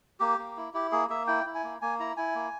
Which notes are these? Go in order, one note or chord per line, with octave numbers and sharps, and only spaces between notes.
A#3 G4
A#3
E4
E4 G4
A#3 G#4
A#3 E5
E4 G5
E4
G#5
A#3
A#3 G#5
E4 A#5
E4 G#5
A#3